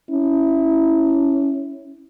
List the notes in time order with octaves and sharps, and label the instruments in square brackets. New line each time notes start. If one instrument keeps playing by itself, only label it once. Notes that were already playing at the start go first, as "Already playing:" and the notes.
[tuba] C#4 [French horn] E4